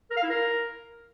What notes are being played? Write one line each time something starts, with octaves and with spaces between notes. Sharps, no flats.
A#4
F5
E4
A#4